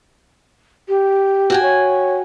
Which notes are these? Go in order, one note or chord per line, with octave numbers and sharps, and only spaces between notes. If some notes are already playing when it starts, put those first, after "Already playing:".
G4
F#4 G5 G#5
C#5